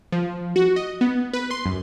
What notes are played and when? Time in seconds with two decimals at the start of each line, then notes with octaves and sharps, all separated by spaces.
0.12 F3
0.56 F#4
0.76 D#5
1.01 B3
1.33 B4
1.51 C6
1.66 F#2